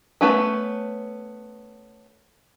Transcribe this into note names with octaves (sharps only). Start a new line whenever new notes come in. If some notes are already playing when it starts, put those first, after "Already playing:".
A3 B3 C#4 B4